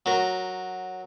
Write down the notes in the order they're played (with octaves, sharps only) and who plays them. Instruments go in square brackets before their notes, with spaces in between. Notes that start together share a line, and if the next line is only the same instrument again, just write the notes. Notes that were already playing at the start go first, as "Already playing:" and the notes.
[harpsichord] F#3 A#4